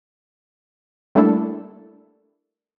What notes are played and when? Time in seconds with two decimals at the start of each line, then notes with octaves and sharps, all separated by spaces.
1.15 G3 A3 A#3 D4 E4 A4